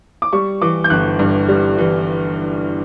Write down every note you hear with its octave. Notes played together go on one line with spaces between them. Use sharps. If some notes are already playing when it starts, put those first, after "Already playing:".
D6
G3 C#6
E3 D6
G6
G1 F#6
G2
G3
E3